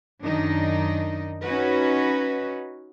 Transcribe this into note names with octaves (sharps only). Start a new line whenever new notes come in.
F#2 D#3 D4 D#4
C#4 D#4 F#4 B4